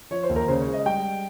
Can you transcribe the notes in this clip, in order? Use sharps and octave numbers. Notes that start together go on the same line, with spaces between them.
F3 C#5
C5
D#2
A#4
C#3 C5
C#5
G#3
D#5
G3 G5